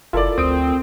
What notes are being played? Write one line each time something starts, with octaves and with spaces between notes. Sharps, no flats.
F#1 E4 F4 A4 A#4 D5
D2 C4 D#6 D7